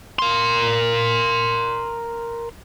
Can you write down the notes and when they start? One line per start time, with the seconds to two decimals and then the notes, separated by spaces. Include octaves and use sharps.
0.19 A#4 C6